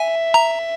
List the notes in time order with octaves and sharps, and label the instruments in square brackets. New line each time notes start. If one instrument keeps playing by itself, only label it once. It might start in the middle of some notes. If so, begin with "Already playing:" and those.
Already playing: [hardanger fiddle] E5 [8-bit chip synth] G#5
[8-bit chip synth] A#5